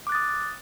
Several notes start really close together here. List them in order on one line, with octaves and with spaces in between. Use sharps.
D6 F#6 A6 D#6